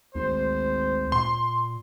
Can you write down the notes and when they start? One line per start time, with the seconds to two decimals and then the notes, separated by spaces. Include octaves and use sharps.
0.15 G#1 D2 C5
1.12 A#2 C6